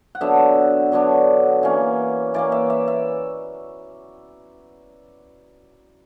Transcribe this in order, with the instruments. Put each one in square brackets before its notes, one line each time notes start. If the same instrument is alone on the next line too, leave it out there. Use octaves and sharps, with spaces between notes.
[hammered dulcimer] F#5
D3 F#3 B3 D4 E5
D3 F#3 B3 D4
E3 A#3 C#4
E3 A#3 C#4 D5
E5
E5
E5